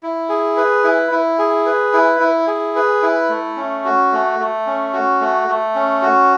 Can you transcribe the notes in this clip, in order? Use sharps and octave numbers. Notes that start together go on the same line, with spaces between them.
E4
G#4
B4
E4
E4
G#4
B4
E4
E4
G#4
B4
E4
A3
C#4
F#4
A3
A3
C#4
F#4
A3
A3
C#4
F#4